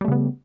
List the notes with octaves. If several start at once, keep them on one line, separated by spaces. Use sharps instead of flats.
C#3 G3 A3 B3